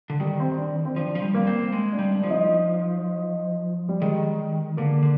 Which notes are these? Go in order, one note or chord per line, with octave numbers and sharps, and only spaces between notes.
D3
D#3 G3
C4
D4
C4
F3 D4
F3
G3
A#3
C4
G#3
D4
G3
D4
F3
D#4
G3
D#3 G#3
D3 A#3
D3